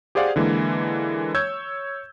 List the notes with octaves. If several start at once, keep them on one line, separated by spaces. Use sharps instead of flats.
G4 G#4 C5 D5 F5 F#5
D3 E3 G#3 A#3
C#5 E6 G6 G#6